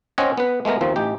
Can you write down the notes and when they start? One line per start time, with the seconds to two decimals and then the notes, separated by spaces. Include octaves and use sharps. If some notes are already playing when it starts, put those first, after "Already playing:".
0.18 C4 C#4 D#5 F#5 G#5
0.37 B3 B4
0.65 G#3 A3 B3 A#4
0.81 D#2 F3 A#3 C4
0.96 A1 D#4 G4 G5